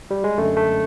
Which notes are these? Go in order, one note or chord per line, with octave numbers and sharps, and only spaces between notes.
G3
G#3
F#2 D3 A3
A3